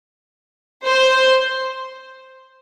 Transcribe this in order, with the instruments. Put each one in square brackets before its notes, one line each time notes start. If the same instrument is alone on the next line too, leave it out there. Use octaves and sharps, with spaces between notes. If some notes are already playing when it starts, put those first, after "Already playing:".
[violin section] C5